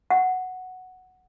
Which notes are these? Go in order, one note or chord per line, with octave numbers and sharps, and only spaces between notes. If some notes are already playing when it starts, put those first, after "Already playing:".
F#5